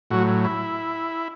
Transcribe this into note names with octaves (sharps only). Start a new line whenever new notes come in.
A2 F#3 F#4
E4